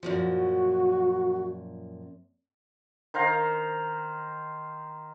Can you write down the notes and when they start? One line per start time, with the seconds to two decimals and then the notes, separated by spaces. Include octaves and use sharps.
0.03 F#2 A#2 F3 F#4
3.14 D#3 C5 F5 A#5